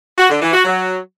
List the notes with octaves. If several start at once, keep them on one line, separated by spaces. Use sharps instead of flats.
F#4
D3
E3
F#4
F#3